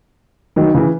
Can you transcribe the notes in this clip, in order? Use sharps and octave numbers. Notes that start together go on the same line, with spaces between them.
D#3 F#3
C#3 E3